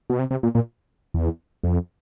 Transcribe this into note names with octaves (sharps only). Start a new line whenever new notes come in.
B2
C3
C3
A#2
A#2
E2
F2